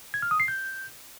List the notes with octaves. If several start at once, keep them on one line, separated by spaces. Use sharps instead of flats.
G#6
F6
D#6
C7
G6